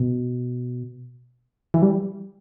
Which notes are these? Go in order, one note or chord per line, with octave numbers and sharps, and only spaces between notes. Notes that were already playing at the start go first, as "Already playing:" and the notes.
Already playing: B2
E3
G3